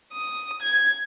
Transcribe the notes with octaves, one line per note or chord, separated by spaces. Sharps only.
D#6
G#6